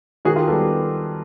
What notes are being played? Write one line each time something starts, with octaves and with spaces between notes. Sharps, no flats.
D#3 F#4 G#4
F4 G4
G3 B3 G4 A4